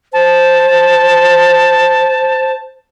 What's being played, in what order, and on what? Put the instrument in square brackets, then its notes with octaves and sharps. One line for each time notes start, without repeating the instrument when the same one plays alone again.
[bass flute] C5 [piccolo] A5